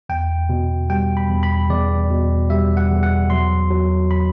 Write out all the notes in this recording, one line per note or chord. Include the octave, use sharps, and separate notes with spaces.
E2 G5
B2
G3 G5
B5
E2
B5
E2 D5
B2
G3 E5
F#5
E2
F#5
F#3 C6
F#3
B5